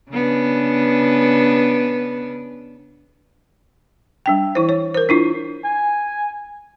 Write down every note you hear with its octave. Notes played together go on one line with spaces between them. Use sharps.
C#3 B3 D4
G3 D4 G5
E3 E4 C5
C#5
A#4 C5
D4 E4 F4
G#5